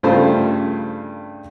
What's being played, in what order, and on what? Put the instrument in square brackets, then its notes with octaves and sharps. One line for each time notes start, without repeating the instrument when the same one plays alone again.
[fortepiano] G2 C#3 A3 F4 C5 C6